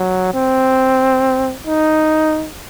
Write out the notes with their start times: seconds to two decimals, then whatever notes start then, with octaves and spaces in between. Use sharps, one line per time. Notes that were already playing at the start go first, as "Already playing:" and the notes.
Already playing: F#3
0.34 C4
1.67 D#4